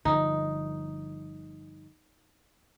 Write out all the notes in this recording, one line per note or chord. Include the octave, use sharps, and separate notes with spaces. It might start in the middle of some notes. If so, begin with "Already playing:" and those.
G1 D3 F3 D#4